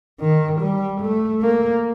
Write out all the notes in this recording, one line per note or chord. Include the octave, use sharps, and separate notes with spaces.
D#3
G3
A3
A#3